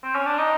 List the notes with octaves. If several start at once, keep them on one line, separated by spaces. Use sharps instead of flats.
C4
C#4
D4
D#4